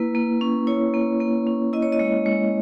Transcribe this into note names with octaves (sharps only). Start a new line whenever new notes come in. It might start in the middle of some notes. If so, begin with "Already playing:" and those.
Already playing: A#3 E4 B4
A#3
C#4
E4 C#5
A#3
A#3
C#4
E4 D#5
C#5
D#5
G#3
G#3